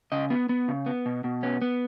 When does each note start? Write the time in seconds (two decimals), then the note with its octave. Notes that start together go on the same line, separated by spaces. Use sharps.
0.12 C#3 D#5
0.30 B3
0.49 B3
0.68 C#3
0.86 B3
1.06 B2
1.24 B2
1.43 B3 C#4
1.62 B3